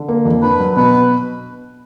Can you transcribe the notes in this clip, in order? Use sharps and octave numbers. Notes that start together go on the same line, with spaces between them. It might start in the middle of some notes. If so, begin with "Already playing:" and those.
Already playing: D3
A#3
F2
D4 B4
F#3
B2 B4